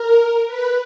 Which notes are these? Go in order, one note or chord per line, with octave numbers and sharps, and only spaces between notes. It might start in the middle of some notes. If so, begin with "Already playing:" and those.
Already playing: A#4
B4